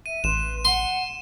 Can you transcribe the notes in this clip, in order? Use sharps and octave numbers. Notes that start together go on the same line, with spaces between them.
E5 D#7
A1 B4 C6 F#6 E7
F#5 C6